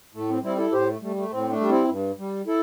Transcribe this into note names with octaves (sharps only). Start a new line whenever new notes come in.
A2 A3
C4
G3 C4 E4
E4 A4
A2 G4 C5
A3
G3 A3
A3
A2 C4
A3 D4
G3
C4 E4
G2
G3
E4 A4